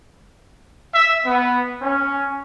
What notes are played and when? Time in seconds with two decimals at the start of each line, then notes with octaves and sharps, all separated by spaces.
0.93 E5
1.26 B3
1.82 C#4